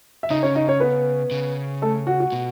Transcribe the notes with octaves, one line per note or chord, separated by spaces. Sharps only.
E5
C#3 D#4 D#5
C#4 C#5
D#4 D#5
C#4 C#5
B3 B4
C#3
A3 A4
F#4
F#4
B2